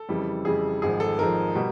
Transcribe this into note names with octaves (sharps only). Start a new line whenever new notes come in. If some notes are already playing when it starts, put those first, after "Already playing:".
Already playing: A4
F2 C#3 E3 G3
F2 C#3 E3 G3 G#4
G#1 G#2 F3 G#4
A4
G#1 G#2 F3 A#4
B2 G3